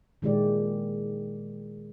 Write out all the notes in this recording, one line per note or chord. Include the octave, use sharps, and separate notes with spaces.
A#2 D#3 G#3 E4 G4 D5